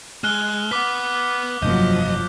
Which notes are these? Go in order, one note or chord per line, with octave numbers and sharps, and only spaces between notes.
G#3 F6 F#6 G7
B4 F#5 D6 B6
F1 G2 F3 F#3 A#3 D#5 G6